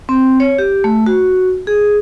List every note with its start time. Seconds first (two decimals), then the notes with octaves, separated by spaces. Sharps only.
0.09 C4
0.40 C#5
0.58 G4
0.84 A3
1.06 F#4
1.67 G#4